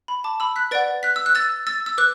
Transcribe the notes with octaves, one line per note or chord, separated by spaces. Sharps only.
B5
A5 D6
B5 E6
F#6 B6
B4 D5 F#5 A6 D7
F#6 B6
E6
F#6
E6 A6
E6 A6
E6
B4 D6 F#6